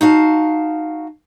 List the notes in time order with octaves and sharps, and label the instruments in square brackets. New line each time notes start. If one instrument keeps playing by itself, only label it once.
[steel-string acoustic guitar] D#4 F#4 F5 A5